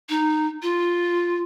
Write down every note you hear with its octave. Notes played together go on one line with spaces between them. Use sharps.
D#4
F4